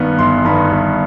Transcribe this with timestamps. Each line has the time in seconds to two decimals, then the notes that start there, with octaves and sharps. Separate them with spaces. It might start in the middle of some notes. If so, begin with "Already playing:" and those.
Already playing: G2 D#3 B3
0.19 G1 C6
0.45 G2 D#3 B3 B5
0.71 G1